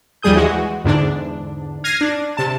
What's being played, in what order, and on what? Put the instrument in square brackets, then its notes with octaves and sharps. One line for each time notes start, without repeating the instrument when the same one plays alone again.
[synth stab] D#2 F3 G3 G#4 D#6 G6
E3 G#3 F#4
E2 G#2 D3 D4
F6 G#6 A#6 C7 D#7
D4
C3 A5